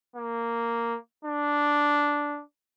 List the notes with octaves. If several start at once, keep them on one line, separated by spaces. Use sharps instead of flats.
A#3
D4